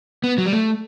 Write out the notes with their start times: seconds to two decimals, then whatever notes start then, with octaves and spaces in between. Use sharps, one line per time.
0.24 B3
0.38 F#3
0.46 G3
0.53 A3